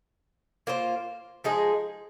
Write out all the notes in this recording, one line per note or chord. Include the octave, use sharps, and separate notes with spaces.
A#3 F4 C5
F3 G#3 D#4 G#4